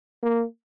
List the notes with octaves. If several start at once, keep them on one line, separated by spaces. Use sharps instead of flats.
A#3